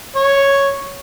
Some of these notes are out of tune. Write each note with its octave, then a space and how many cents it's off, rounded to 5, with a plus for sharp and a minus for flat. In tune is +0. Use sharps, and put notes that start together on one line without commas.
C#5 +0